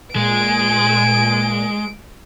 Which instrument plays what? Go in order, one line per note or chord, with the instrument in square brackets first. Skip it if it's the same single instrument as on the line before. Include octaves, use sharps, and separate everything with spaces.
[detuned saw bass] A#2 [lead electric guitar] G#3 [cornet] G#5 [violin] D7